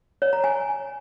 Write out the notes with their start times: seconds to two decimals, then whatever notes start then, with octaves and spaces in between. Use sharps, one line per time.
0.22 C#5
0.33 A#5
0.44 G#5